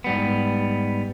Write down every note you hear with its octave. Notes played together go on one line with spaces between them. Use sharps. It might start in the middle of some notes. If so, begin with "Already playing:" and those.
G#2 G3 B3